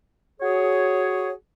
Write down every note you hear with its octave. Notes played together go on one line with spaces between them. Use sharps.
F#4 G#4 C#5